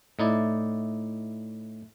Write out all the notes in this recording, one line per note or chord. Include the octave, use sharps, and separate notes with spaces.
A2 D#4 E4 D5